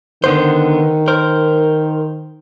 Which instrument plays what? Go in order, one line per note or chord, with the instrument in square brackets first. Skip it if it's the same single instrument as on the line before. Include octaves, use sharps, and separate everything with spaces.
[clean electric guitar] D3 B3 C5 [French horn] D#3
[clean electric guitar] A#4 C5